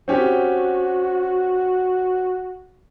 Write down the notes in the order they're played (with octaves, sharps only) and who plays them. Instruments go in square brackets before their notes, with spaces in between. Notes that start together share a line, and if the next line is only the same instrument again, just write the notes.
[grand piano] C4 C#4 G4 [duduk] F#4